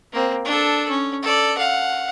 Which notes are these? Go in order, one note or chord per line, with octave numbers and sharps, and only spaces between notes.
A#3 C4
D4 A4
C#4
A4 D5
F5 F#5